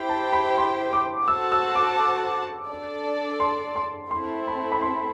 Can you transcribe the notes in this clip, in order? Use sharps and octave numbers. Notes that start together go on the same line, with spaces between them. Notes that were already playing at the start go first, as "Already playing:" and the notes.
Already playing: E4 G4 C5 G5 B5
A5
B5
C6
D6
F#4 A4 C5 F#5 A5 E6
E6
D6
D4 A4 D5
C6
C6
A3 C4 E4 C6
B5
B5
C6